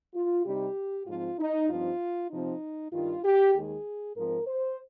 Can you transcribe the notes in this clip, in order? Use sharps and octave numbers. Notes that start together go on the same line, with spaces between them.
F4
C3 G3 C4 D#4 G4
G#2 F3 C4 F4
D#4
G2 F3 C4 D#4 F4
C3 F3 C4 D#4
G2 D#3 G3 D4 F4
G4
D#2 D#3 G#3 G#4
G#2 F3 C4 D#4 A#4
C5